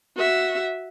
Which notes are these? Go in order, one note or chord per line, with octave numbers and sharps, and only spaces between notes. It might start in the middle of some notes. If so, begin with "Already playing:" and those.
F#4 E5